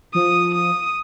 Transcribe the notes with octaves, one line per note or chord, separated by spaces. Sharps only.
F3 D#6
D#6